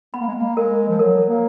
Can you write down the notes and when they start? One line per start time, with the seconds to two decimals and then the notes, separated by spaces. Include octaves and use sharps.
0.14 B3 B5
0.20 A#3
0.27 G#3
0.35 A#3
0.56 G#3 A#4
0.89 F3
0.99 F#3 A#4
1.28 A#3